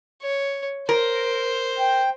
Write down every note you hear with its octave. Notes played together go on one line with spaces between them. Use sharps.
C#5
A#4 C5
G5